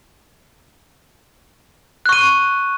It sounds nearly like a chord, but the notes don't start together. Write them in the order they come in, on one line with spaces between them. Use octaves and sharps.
F#6 C#6 D#7